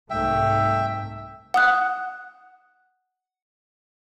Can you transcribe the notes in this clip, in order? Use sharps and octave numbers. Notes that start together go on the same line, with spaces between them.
C2 G#2 A3 E5 G5
F#5 D#6 F#6